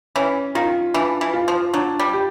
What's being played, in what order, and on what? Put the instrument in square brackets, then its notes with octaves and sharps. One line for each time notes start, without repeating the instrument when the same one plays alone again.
[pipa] E3 [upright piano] C#4
[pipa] D#3 [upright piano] F4
[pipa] E3 [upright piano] D4
[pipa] E3
[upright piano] F4
[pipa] F3
[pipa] F#3 [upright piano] D4
[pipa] G3
[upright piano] G4